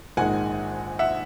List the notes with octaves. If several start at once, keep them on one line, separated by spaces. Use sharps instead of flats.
A#1 G#2 D#3 G#3 F#5 G#5
E5 F#5